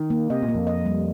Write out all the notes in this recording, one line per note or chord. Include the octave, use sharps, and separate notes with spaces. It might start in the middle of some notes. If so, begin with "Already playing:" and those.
Already playing: D#3
A#3
C3 D#5
A#2
A#3
F2
D#5
G3